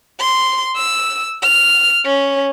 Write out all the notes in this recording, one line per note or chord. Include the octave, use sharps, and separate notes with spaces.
C6
E6
F6
C#4